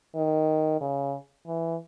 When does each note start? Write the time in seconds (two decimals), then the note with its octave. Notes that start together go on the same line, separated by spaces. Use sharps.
0.15 D#3
0.81 C#3
1.47 E3